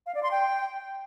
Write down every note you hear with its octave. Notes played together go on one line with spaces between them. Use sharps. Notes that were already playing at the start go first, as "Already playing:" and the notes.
F5
D5
C6
G5